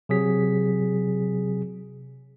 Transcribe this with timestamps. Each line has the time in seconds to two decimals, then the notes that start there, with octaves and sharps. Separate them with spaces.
0.09 C3 F#3 G#4 B6